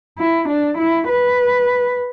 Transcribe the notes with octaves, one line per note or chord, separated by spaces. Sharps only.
E4
D4
E4
B4